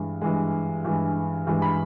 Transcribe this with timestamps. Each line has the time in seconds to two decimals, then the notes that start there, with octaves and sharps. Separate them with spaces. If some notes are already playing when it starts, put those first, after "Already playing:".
Already playing: G2 E3 G#3
0.21 G2 E3 G#3
0.84 G2 E3 G#3
1.47 G2 E3 G#3
1.62 B5